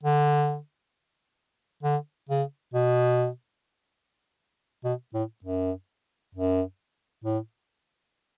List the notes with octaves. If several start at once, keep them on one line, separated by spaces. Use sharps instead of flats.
D3
D3
C#3
B2
B2
A2
F#2
F#2
A2